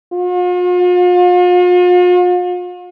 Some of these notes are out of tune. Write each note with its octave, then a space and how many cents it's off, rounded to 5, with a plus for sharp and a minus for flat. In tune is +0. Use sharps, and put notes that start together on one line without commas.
F4 +45